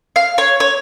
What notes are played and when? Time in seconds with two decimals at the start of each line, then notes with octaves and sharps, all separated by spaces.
0.16 F5
0.38 C#5
0.60 C#5